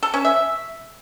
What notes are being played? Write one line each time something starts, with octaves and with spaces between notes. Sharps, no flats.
A4
C#4
E5